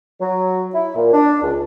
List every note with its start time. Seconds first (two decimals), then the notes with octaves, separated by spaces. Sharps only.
0.20 F#3
0.74 E4
0.96 A#2
1.13 D4
1.43 C#2